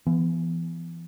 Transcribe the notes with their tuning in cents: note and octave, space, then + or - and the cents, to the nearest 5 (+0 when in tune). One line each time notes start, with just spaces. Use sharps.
E3 +35 B3 +0